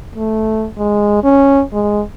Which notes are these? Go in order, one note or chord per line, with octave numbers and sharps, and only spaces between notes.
A3
G#3
C#4
G#3